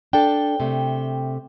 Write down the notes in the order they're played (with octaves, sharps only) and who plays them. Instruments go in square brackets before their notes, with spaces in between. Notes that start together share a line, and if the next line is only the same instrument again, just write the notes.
[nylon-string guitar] D4 A4 [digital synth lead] G5
[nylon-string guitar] C3 A3